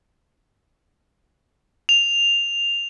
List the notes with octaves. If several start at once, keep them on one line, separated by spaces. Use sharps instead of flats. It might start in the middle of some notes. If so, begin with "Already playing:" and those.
F7